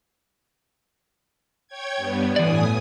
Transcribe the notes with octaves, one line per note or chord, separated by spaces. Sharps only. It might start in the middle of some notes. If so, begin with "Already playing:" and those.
C#5 G5 G#6
G2 B3
A2 E3 D5 G#5 D#6